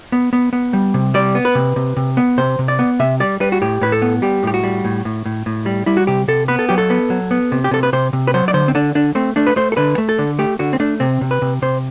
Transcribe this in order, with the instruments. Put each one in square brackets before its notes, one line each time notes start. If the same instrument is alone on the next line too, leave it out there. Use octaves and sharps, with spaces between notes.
[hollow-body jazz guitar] B3
B3
B3
G3
C3
G3 D5
B3
B4
C3
C3
C3
B3
C3 C5
C3
D5
B3
C3 E5
G3 D5
G3 B4
F#4
A2 G4
A2 B4
A4
B3
G3 G4
A2 G4
F#4
G3
A2
A2
A2
A2
G3
G3 E4
F#4
C3 G4
C3 A4
B3 B4
A4
F#3 G4
A4
B3
F#3
B3
C3
G4
C3 A4
B4
C3 C5
C3
B4
F#3 C5
D5
D3 C5
C4
D3 D4
D3 D4
A3 C4
A3 D4
B4
A3 C5
A4
D3 B4
A3
A4
D3
A3 G4
D3 F#4
C4
A3 D4
C3 C4
C3
B4
C3
C3 C5